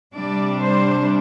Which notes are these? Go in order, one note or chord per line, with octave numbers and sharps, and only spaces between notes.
C3 G3 D4 D5
C5